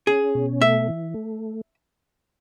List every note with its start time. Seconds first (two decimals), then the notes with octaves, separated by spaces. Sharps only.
0.07 C#4 G#4
0.35 B2
0.61 A3 E5
0.88 E3
1.14 A3